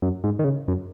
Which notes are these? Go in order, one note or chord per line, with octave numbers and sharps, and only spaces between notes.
F#2
G#2
D#3
C#3
F#2